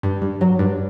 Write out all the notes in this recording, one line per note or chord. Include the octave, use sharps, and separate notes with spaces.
G2
G2
F#3
G2